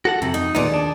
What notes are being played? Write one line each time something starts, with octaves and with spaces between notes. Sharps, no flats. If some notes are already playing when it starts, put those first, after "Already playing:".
F#4 A4 F#5
F2 C3
D#4
D#2 A#2 B3 D#4 G#4 D5
D4